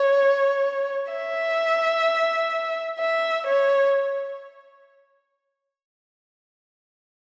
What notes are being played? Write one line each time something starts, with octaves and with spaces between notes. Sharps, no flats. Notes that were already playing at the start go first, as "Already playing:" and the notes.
Already playing: C#5
E5
E5
C#5